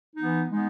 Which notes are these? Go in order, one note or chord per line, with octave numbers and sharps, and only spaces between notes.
E3 B3 D#4
G#3 B3 D#4